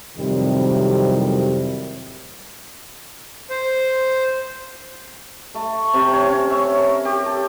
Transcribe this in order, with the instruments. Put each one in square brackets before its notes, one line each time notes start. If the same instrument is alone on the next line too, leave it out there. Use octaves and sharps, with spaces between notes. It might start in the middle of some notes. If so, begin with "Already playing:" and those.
[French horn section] F2 A2 C3 D#3 F#3 G3
[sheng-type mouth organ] C5
[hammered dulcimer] A3
C3
C#5
C#4
E5
C#5
A#4
G4
A4